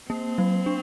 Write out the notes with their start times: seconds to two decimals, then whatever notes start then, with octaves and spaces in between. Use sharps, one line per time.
0.10 A#3 C4
0.38 F#3
0.66 D4